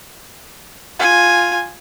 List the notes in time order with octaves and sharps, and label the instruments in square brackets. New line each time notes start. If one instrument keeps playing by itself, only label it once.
[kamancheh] F4 G#5